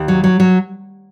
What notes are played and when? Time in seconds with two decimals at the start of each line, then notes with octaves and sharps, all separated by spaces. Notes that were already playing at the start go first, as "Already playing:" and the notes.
Already playing: D#2
0.08 F#3
0.24 F#3
0.40 F#3